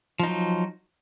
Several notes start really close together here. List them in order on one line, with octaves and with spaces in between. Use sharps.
F3 D#4 F#3